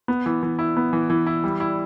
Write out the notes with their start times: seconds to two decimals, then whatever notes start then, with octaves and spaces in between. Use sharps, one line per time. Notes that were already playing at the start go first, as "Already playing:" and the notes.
0.08 B3
0.26 E3
0.43 E3
0.59 E4
0.77 B3
0.93 E3
1.10 E3
1.27 E4
1.44 G3
1.60 E4